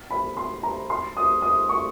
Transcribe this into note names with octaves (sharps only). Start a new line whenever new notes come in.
B5
C6
A#5
C6
D#6
D#6
C#6